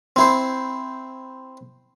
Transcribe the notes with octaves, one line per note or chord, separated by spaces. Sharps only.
C4 E4 C5